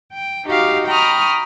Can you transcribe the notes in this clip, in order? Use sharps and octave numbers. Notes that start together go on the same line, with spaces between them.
G5
D#4 F#4 G4 F5
G5 A#5 B5 C#6 D#6 F6